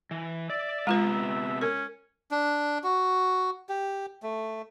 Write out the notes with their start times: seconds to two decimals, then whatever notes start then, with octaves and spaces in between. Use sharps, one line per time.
0.11 E3
0.50 D5 E5
0.87 C3 G#3 B3 F4 B4 A#5
1.61 C#4 A#4
2.31 D4
2.84 F#4
3.69 G4
4.23 A3